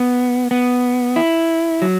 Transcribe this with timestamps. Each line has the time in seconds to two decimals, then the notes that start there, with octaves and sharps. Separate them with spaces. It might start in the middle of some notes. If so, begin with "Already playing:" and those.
Already playing: B3
0.51 B3
1.16 E4
1.82 F#3